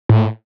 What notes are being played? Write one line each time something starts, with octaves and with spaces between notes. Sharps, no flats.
A2